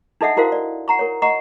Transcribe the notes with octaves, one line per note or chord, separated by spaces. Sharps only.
D4 D#4 A4 D#5 E5 F#5
E4 F#4 A#4 C5 F5
D5
F#5 A#5 C#6
A#4 C#5
D#5 F#5 A#5 C#6